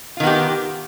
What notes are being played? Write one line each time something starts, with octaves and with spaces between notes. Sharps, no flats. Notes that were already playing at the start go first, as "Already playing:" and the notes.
D#3 B3 F4 G4